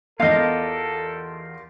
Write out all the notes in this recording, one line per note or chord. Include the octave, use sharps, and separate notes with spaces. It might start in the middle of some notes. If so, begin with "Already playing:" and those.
E2 B3 F4 G4 A4 A#4 D#5 F5